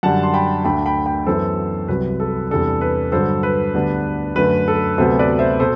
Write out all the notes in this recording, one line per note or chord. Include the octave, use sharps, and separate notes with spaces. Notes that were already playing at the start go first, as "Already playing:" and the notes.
F#2 D3 G3 D4 F#5 A5
C6
G5 B5
D2 D3 A3 D4 G5 B5
G5 B5
G5 B5
F#2 E3 B3 A4 C5
C2 C3 F#3 B4
A4
E2 C3 G3 D4 A4
B4
G2 D3 F#3 A4 C5
B4
D2 D3 G3 B3 D4
F#2 D3 A3 B4
A4
D2 C3 F#3 B3 A4 C5
B4 D5
C5 E5
B2 A4 C5